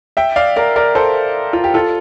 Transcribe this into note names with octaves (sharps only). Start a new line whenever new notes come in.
E5 G5
D5 F5
A#4 D5
A#4 D5
A4 C5
F4
G4
F4 A4